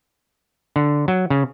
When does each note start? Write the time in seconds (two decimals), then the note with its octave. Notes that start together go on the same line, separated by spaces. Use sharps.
0.76 D3
1.08 F#3
1.30 C#3